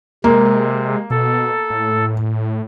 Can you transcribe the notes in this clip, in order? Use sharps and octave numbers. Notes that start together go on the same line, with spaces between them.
C3 G#3 A#3
B2 A4
A2